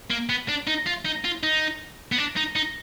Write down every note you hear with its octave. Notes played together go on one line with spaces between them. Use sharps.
A#3
B3
D4
D#4
F4
D#4
F4
D#4
B3
D4
D#4
D#4